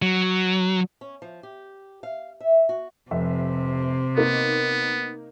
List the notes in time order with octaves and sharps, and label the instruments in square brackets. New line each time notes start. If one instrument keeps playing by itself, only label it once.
[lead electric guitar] F#3
[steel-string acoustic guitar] C#4
F3
G4
F5
E5
F#4
[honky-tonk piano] F1 E5 [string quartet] C3
[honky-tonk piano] A#3 D#4 A#4 [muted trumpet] B3